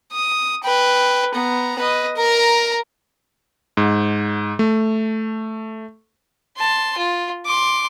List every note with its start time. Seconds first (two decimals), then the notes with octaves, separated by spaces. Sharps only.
0.12 D#6
0.64 B4 G5
1.35 B3 A#5
1.79 B4 D#5
2.17 A#4 A#5
3.77 G#2
4.59 A3
6.57 A5 C6
6.98 F4
7.46 C6 D6